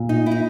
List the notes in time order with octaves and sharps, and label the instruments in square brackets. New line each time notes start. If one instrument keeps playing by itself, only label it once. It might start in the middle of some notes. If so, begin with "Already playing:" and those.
Already playing: [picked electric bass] A#2
[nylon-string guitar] D#4
E4
D#4